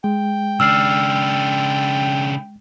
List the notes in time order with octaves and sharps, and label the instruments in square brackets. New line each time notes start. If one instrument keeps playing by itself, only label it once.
[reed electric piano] G#3 [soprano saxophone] G5
[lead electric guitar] C#3 D4 [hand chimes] E6 F6 C7